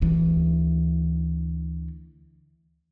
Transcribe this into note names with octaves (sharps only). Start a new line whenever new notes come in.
D2 E3